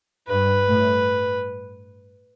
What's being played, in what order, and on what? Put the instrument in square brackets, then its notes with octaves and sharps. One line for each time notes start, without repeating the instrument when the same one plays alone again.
[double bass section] G2 [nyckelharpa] B4
[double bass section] A2